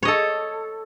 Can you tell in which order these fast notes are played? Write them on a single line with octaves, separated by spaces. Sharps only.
C#5 D#5 A4